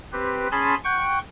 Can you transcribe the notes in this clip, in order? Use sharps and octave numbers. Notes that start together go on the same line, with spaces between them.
C4 G4 B4
C#4 G#4 G#5 A5 B5 C6
F#5 G5 C#6 G6